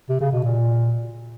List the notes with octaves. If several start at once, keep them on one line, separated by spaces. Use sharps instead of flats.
C3
C#3
B2
A#2